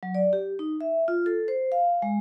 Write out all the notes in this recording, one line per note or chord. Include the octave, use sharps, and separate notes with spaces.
F#3
D5
G4
D#4
E5
F4
A4
C5
F5
G#3